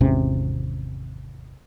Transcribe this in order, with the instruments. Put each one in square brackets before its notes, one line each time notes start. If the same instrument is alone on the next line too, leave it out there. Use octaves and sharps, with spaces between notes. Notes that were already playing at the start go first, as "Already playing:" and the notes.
[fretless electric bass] G#1 E2 C3 C#4